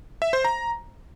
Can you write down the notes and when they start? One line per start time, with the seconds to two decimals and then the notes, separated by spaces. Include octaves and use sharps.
0.22 E5
0.33 C5
0.45 A#5